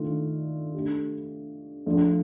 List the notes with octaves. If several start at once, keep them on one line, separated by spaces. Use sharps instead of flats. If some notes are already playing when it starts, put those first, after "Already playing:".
Already playing: D#3 A3 D4 F4
A3 D4 G4
F3 A3 D4 F4